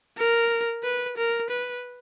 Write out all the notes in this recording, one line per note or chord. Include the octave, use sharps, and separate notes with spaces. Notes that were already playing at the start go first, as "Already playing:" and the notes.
A#4
B4
A#4
B4